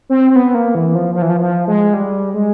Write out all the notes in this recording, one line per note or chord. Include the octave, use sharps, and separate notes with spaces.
C4
C4
B3
A#3
E3
F3
F3
E3
F3
F3
G#3
G3
G#3